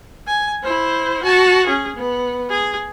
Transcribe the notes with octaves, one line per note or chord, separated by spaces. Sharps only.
G#5
E4 C5
F#4 A5
C#4 G#4
B3
G#4